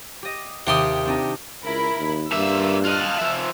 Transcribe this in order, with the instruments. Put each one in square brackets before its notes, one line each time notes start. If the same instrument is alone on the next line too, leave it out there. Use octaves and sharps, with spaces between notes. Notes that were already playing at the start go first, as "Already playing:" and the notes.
[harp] G4 D#5
[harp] D#2 D#6 [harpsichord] C3 G4 C6
[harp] C4 D4 D#4
[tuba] C#2 [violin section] E4 A#4 B5
[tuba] D#2
[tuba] G2 [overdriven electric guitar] A#3 E5 [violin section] F4 E6
[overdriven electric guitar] F4 D#5 [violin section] A5 F6 F#6
[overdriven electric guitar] F3 E5